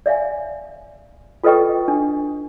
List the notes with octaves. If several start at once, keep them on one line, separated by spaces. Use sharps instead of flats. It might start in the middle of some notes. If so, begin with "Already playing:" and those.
D5 E5 F5 G#5
F4 A4 B4 D#5 G5 C#6
D4